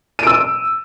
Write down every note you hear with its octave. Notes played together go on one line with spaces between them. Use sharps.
E6 D7 D#7